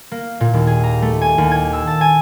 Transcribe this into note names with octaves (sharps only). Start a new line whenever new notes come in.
A#3
A#2
D#2
G#4
A#5
A3
G#5
D#2
G#6
E6
A5
G#5